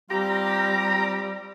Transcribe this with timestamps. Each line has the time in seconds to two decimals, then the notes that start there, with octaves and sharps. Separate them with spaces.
0.10 G3 C4 F4 G4 A#5